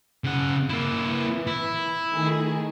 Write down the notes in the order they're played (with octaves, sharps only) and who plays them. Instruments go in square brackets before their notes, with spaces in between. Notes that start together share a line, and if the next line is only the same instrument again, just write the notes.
[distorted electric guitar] C#3 F#5
A#3 E4
[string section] E3
[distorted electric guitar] E4
[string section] D#3 A3 G#4